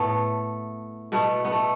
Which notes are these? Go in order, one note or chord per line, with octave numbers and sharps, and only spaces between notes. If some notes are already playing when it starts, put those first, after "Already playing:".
Already playing: A2 A3 B3
B2 A3 B3
B3
A3